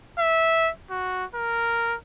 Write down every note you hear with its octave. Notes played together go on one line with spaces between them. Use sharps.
E5
F#4
A#4